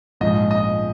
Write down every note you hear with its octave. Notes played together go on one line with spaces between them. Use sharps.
A#1 G#2 F3 D#5
D#5